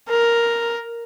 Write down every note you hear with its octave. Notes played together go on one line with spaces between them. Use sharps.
A#4